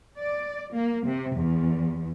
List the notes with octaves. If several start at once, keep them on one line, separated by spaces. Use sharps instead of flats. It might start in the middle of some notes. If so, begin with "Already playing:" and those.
D5
A#3
C3
E2